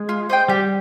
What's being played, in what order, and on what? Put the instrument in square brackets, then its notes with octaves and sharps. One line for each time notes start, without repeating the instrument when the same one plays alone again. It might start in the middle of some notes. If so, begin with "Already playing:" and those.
Already playing: [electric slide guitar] G#3
[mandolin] F4
C5 D#5 G5
[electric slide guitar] G3 [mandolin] G4